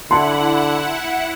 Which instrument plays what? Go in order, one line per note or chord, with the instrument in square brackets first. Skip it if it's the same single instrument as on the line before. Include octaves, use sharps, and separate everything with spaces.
[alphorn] D3 [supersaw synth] E4 F#5 [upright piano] A5 C6